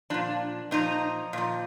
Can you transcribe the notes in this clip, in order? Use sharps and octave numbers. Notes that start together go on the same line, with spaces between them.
A#2 F3 D4
A#2 F3 D#4
A#2 F3